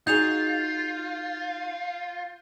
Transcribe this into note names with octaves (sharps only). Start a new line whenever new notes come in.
D#4 F4 F#4 G#4 G6 F7